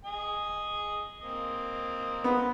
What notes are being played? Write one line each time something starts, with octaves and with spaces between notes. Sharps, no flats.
D#5 G#5
A#3 C4 D#5
B3